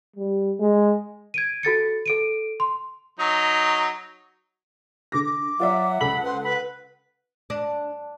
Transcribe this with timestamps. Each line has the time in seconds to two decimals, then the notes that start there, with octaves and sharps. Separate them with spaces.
0.16 G3
0.60 G#3
1.34 G#6 D7 D#7
1.63 F#4 A4 A6 C#7
2.06 A4 D7 D#7
2.60 C6
3.19 F#3 D#4
5.12 D3 D6 A#6
5.24 D6
5.60 F#3 F4 D5 E5 F#5
6.01 C#2 A4 B5 F#7
6.23 B4 C5
6.45 B4 B5
7.50 D4